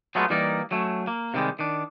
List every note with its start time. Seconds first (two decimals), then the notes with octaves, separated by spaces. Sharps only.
0.15 F#3 G#3 A3 B3 F4
0.30 E3 G3 A#3 D#4 A#4 D5
0.71 F#3 A3 C#4
1.07 A#3
1.34 C3 D#3 G3 G#3
1.59 D#3 D4